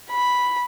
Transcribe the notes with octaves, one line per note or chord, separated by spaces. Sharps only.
B5